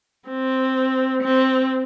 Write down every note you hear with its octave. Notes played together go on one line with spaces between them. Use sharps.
C4
C4